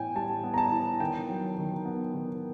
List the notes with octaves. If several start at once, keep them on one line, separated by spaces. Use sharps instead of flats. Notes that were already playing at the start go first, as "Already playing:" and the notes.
Already playing: A2 E3 B3 G5 G#5
G3 A5
B3
A#5
A5
E3
D#3 G5
F#3
D#3
B3
D#3